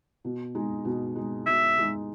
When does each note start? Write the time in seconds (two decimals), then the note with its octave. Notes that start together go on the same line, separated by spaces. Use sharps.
0.25 B2
0.55 G#3 D#4
0.85 B2
1.16 G#3 D#4
1.46 B2 E5
1.78 G#3 D#4